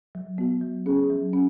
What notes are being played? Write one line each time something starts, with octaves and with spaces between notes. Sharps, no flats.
F#3
B3 F#4
F#3
C#4 G#4
F#3
C#4